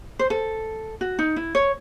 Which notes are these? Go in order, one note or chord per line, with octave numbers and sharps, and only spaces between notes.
C5
A4
F#4
D#4
E4
C#5